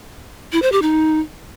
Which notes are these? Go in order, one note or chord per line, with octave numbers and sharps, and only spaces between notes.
E4
C5
G4
D#4